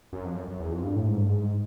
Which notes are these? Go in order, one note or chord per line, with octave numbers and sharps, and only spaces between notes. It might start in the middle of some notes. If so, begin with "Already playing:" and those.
F#2
F2
F#2
F#2
E2
F2
G2
A2
G#2
G2
G#2